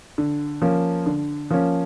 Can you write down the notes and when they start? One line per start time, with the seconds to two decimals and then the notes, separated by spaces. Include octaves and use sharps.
0.18 D3
0.62 F3 A#3 C#4
1.06 D3
1.51 F3 A#3 C#4